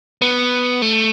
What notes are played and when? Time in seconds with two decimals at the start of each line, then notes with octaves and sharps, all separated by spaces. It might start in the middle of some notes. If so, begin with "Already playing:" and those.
0.22 B3
0.82 A3